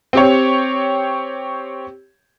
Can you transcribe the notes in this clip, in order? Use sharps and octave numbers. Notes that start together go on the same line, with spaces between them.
C4 G4 C#5